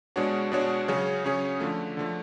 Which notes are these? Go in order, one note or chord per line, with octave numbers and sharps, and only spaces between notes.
B2 G#3 D4 F#4 C#5
B2 G#3 D4 F#4 C#5
C#3 F#3 C#4 G#4 C#5
C#3 F#3 C#4 G#4 C#5
D3 F3 A3
D3 F3 A3